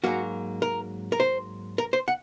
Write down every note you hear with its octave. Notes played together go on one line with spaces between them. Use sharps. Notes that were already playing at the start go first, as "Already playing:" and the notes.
G#2 F#3 A#3 F#4
A#4
A#4
C5
A#4
C5
F#5